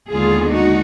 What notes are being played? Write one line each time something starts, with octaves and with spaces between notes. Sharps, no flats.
D#2 D3 G#3 B3 F4 G#4
D#4 F#4